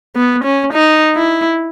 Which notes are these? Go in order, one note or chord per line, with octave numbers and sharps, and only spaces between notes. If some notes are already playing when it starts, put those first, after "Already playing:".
B3
C#4
D#4
E4